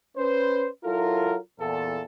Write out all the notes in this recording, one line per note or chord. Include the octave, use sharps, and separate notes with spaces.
C#4 B4 C5
F#3 E4 F4 A4 A#4
E2 A#2 A4